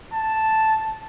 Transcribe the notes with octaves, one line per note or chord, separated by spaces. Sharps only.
A5